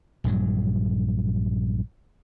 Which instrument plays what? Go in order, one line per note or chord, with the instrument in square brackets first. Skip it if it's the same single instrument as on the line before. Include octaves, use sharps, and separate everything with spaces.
[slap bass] A#1 G2 F#3